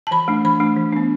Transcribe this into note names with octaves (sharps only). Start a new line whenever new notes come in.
A5
E3 B5
A3 D4
E3 B5
A3 D4
E3
B3 D4